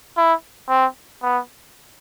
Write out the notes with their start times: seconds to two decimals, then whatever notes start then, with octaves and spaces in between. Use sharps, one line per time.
0.17 E4
0.69 C4
1.23 B3